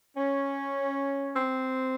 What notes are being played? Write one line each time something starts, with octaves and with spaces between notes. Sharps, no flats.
C#4
C4